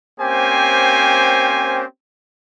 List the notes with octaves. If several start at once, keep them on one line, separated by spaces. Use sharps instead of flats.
A#3 C4 C#4 G4 C5 G#5